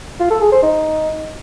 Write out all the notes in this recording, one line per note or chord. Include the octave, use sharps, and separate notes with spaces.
F4
A4
G#4
C5
D#4